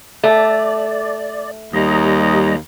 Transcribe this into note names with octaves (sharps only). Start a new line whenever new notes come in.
A3 D5
D#2 G3 D#5 A#5